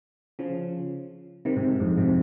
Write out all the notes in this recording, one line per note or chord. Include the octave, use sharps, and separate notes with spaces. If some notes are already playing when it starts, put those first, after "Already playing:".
C#3 F3
C3 D#3
G#2 C3
F2 G#2
G#2 C3